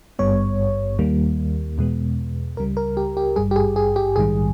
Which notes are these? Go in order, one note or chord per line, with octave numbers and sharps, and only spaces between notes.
G#1 G2 G3 B3 C#5
D#2 D#3 G3 A#3
E2 B2 G#3 B3
C#2 C#3 G3 A#4
A#4
G4
G4
G#1 G2 G3 G#4
G4
G#4
G#4
G4
A#1 G#2 D#3 G3 G#4